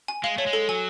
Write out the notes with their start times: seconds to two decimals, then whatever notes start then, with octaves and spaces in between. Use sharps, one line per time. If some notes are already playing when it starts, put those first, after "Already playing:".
0.08 G#5
0.23 G#3 F5
0.38 A3 C#5
0.46 G#3
0.53 A4
0.69 F#3 G#5